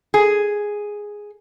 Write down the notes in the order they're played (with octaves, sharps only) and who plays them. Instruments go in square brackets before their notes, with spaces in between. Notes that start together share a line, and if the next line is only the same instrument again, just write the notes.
[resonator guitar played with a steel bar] G#4